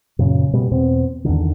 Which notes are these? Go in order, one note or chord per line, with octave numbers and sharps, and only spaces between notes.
F#2 A#2 C#3 C#4
B2 G3 G#3
E2 B2 C4
E2 B2 D3 D#3